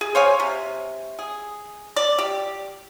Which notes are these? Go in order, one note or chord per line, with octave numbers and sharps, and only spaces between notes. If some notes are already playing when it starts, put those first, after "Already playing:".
G#4
C5 C#5 F5 G#5
C3
G#4
D5
G4